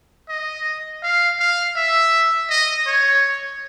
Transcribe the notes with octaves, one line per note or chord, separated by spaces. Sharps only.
D#5
F5
F5
E5
D#5
C#5